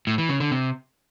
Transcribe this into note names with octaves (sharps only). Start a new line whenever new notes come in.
A2
E3
C#3
D3
C3